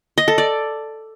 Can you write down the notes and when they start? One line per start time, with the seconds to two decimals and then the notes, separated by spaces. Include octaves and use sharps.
0.18 D#5
0.28 A4
0.38 D5